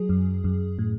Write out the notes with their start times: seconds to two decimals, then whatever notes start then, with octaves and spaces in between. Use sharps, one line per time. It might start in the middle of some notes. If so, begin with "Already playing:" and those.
Already playing: F#3 G#4
0.09 F#2
0.44 F#2
0.79 A2